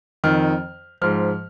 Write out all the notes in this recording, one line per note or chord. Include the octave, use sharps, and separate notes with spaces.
F2 D#3 F6
G#2 F3 F6